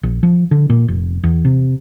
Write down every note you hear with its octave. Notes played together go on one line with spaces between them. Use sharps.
A#1
F3
D3
A#2
F1
E2
C3